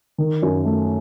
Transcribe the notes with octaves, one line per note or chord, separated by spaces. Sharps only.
D#3
F#2
A3